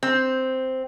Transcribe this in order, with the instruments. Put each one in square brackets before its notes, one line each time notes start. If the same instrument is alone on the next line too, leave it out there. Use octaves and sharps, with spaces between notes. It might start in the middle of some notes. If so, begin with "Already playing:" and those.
[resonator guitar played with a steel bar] C4